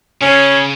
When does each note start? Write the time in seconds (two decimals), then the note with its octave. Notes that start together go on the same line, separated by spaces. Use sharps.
0.21 C#3 C#4